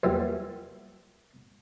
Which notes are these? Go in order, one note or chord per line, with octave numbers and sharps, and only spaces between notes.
E2 A#2 E3 F#3 G3